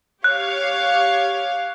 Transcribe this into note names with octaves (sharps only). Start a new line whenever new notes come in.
G4 C#5 F5 F#6